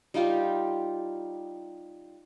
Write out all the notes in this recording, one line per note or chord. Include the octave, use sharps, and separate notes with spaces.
G3 D#4 F4 G4